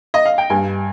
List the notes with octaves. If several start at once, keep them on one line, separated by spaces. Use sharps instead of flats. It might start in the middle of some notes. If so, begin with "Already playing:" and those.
D#5
F5
G5
G2 G#5